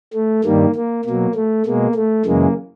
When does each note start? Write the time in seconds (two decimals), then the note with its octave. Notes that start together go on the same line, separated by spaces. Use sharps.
0.14 A3
0.44 G2 D#3 G3 A#3
0.75 A#3
1.05 B2 F#3 A#3
1.35 A3
1.66 B2 G#3 A#3
1.95 A3
2.26 F#2 C#3 E3 G#3 A#3